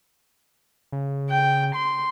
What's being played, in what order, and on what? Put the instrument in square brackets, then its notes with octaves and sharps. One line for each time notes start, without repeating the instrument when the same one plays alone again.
[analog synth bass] C#3
[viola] G5
C6